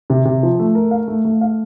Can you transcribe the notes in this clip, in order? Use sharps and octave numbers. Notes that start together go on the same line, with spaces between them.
C3
C3
F3
A3
A#4
F5
A3
A3
F5